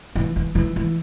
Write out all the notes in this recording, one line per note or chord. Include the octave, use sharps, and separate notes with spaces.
E3
E3
E3
E3